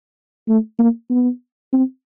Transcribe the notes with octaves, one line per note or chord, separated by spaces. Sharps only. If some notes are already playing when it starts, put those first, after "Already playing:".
A3
A#3
B3
C4